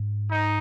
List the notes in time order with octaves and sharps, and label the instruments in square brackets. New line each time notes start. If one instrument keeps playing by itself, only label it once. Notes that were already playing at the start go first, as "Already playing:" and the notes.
Already playing: [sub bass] G#2
[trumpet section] D#4